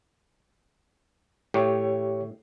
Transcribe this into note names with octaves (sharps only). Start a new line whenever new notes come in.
A2 G4 C#5 C#6